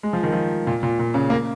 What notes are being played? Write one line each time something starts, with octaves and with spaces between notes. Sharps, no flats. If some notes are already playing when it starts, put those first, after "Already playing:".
G#3
F3
D#3
F3
A#2
A#2
A#2
C#3
A#3